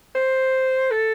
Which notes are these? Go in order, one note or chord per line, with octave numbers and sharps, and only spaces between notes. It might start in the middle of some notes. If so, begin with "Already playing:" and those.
C5
A4